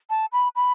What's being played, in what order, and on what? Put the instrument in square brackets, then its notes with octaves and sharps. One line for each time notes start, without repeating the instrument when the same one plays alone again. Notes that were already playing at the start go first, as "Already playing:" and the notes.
[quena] A5
B5
B5